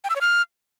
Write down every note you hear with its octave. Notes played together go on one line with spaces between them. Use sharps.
G5
E6
C#5
F6